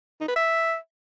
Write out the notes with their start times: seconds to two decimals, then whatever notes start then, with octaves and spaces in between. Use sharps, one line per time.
0.21 D#4
0.28 B4
0.36 E5